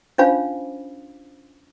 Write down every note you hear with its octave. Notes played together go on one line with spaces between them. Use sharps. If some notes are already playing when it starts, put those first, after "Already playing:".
C#4 D4 F4 C5 F5 B5